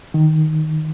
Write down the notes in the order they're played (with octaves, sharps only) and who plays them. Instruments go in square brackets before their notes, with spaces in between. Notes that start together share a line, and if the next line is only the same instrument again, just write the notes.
[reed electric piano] D#3